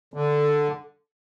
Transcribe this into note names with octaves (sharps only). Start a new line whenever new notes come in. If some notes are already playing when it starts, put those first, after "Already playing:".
D3